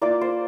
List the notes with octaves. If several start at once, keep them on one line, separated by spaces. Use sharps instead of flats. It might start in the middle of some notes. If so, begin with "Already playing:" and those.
A#3 F4 D5
C5